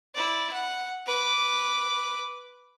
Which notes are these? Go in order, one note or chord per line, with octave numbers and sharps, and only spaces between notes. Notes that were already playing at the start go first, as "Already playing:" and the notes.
E4 D5
F#5
B4 D6